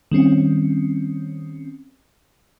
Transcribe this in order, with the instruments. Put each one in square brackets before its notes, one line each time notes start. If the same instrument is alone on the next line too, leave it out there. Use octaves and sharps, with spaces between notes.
[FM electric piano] D#3 G3 C4 C#4